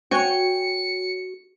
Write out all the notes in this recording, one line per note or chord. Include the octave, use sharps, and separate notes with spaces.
F#4 C#5 G5 G#5 C#7